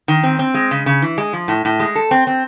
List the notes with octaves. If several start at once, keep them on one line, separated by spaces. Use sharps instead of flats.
D#3
C4
C4
G#3
C#3
C#3
E3
G#3
F3
A2
A2
G#3
A4
C4
C4